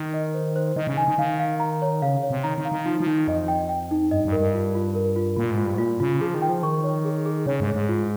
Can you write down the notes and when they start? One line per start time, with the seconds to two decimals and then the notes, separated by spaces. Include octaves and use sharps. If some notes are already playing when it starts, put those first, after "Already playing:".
Already playing: D#3
0.14 D#5
0.34 C5
0.56 C5
0.76 D#3 D#5
0.87 C#3
0.97 D#3 G#5
1.08 D#3
1.18 D#3 F5
1.40 F5
1.60 A#5
1.82 C#5
2.02 C#3 F5
2.23 C#5
2.30 C3
2.44 D#3 A#5
2.58 D#3
2.65 F5
2.72 D#3
2.86 F3 D#4
3.00 F3
3.07 D#3 D#4
3.28 F2 D#5
3.48 G5
3.69 G5
3.91 D#4
4.11 G2 D#5
4.25 G2
4.32 A#4
4.40 G2
4.54 F4
4.75 F4
4.95 A#4
5.16 F4
5.37 A#2 F4
5.51 G#2
5.58 F4
5.65 G2
5.74 G#2
5.78 A#2 F4
6.00 C#3 F4
6.21 F3 G#4
6.35 D#3
6.42 G5
6.49 F3
6.63 D#3 C#6
6.84 C#5
7.05 G#4
7.26 G#4
7.46 C#3 C#5
7.60 G#2
7.68 G#4
7.74 G#2
7.89 F4